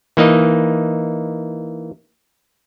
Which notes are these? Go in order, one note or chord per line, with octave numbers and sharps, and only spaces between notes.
E3 A#3 D#4 D#5